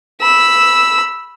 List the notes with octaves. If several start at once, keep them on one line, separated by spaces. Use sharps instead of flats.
B5 E6